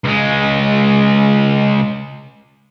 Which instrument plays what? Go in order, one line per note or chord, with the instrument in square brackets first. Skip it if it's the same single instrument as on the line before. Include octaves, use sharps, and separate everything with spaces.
[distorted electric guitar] C#2 G#3